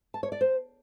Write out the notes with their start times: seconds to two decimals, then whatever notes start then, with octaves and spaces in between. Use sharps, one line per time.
0.14 A5
0.23 C#5
0.32 D5
0.41 C5